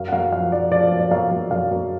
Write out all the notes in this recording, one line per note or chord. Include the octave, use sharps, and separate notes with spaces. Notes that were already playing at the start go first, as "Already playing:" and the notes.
Already playing: F#2 F5
F#5
F#2 F5
F3 F5
F3 D5
F3 D5
F#2
D5
F#2 F5
F#2
F#2 F5
F#2